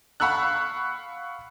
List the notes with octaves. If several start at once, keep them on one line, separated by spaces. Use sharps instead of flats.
F5 F#5 B5 C#6 E6 F#6